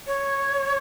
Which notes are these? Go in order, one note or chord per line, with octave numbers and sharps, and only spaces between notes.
C#5